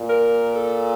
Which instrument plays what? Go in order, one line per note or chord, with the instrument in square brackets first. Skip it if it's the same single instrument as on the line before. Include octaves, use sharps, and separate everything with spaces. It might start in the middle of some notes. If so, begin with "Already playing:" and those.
Already playing: [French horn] A#2
[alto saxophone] A#4
A4